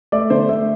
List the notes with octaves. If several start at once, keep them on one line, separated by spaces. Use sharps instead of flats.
A3 D5
D3 C5
A3